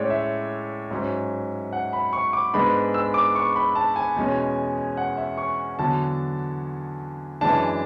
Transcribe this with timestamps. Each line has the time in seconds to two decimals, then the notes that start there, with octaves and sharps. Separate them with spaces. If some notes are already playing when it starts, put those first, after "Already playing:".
Already playing: A2 G#3 C#4 C#5 D5
0.10 E5
0.91 G#2 F#3 C#4
1.73 F#5
1.93 B5
2.13 C#6
2.33 D6
2.54 G#2 G#3 B3 D4 B5
2.94 E6
3.14 D6
3.35 C#6
3.56 B5
3.75 A5
3.96 G#5
4.16 E2 B2 G#3 C#4
4.97 F#5
5.17 E5
5.38 C#6
5.79 E2 D3 F#3 A5
7.41 F#2 E3 G#3 D4 A5